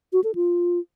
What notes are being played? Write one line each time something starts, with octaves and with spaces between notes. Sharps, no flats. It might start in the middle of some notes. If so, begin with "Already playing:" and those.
F#4
A4
F4